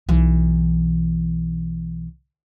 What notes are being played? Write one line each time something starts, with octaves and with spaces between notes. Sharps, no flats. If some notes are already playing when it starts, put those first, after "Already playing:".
B1 E3